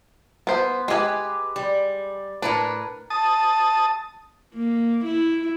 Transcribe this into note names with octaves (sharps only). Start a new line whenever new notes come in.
B3 C5
G#3 G4 B4 G#5
G3
A2 D4 A#4 B4
A5 D#6
A#3
E4